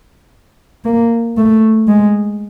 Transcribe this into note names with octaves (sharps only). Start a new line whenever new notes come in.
A#3
A3
G#3